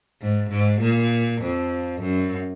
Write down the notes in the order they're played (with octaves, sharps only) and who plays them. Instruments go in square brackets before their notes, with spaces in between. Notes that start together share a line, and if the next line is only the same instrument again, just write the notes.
[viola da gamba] G#2
G#2
A#2
F2
F#2